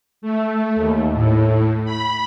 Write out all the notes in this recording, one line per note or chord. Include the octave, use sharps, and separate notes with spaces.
A3
D#2
A2
B5